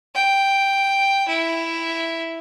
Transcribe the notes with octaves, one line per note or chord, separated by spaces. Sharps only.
G5
E4